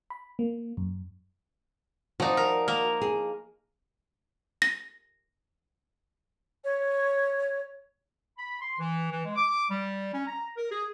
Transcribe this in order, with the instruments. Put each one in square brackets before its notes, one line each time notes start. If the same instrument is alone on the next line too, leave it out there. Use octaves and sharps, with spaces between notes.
[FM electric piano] B5
A#3
F#2
[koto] F3 D#4 [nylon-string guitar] F#4 D5
[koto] A#4
A#3 A#4
[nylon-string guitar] G#4
[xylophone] A#6
[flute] C#5
[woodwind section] B5
C6
E3
E3
G#3
D6
G3
C#4
A#5
A#4
G#4